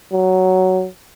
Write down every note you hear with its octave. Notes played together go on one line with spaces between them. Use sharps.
F#3